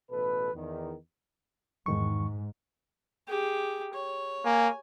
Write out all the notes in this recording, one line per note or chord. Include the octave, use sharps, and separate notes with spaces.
A1 B2 A4 B4
E2 D#3
E2 G#2 D#3 C#6
G4 G#4
C#5
A#3 G#5